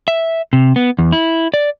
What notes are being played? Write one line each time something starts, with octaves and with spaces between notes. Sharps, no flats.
E5
C3
B3
E2
E4
D5